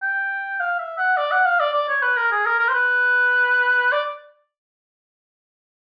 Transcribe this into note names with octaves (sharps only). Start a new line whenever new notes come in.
G5
F5
E5
F#5
D5
F#5
F5
D5
D5
C#5
B4
A#4
G#4
A#4
A#4
C5
B4
D5